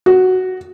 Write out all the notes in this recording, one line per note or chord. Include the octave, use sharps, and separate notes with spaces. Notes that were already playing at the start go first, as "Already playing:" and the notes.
F#4